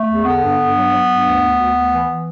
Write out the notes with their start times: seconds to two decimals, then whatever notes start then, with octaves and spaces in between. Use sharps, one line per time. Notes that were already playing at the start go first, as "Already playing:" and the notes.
Already playing: A3
0.08 E2
0.25 D3 B3
0.41 G2
0.58 G2
0.75 F#3
0.91 F#3
1.08 G2
1.24 D2
1.41 D2
1.58 D2
1.74 D2
1.91 E3
2.08 E3